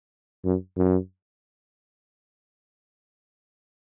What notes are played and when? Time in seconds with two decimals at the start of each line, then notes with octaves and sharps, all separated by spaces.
0.45 F#2
0.77 F#2